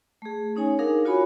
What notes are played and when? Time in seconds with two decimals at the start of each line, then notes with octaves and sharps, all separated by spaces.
0.22 A3 G#4
0.56 C#4 D#4 C#5 G#5
0.79 D4 D#4 G#4 A#4 F5 F#5
1.05 F4 F#4 C#5 G#5 B5